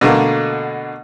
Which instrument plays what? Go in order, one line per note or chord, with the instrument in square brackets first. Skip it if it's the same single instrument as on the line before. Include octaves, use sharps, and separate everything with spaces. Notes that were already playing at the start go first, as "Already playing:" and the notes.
[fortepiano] B2 D3 A3 A#3